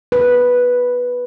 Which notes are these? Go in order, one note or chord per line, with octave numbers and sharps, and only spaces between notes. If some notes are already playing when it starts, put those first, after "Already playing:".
B4